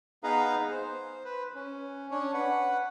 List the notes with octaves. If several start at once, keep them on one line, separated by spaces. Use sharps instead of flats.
B3 D#4 G#4 B4 F5 A#5
C5
B4
C#4
C#4 D4 C#5
B4 F#5